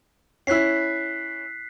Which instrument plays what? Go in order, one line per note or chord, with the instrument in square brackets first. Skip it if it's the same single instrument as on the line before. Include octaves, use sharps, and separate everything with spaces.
[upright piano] C#4 E4 [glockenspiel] F#6 B6 C7